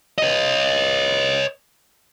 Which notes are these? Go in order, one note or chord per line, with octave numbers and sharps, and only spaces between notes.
C#5 D#5